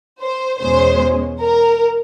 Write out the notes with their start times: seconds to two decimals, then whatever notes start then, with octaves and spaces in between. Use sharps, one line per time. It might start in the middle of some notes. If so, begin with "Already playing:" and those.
0.20 C5
0.60 E2 B2 G#3 C#4 C5
1.41 A#4